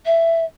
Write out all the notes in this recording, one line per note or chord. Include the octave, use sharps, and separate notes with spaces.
E5